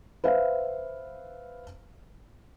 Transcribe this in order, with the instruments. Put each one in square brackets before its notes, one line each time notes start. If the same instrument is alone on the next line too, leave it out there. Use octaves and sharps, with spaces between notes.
[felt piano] B4 C5 E5 F5